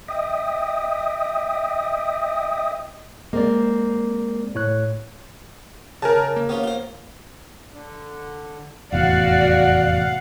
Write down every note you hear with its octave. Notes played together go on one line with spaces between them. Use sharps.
D#5 E5 G5 D#6
G#3 A#3 C4 D5
A2 C#5 F#6
C#3 A#4 G#5 A5
A#3
B3 C#4 F4
F4 C5
D3
F1 E2 A2 F#4 D5 F5 F#5